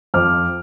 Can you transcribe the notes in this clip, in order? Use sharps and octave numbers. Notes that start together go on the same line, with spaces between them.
F2 D6 F6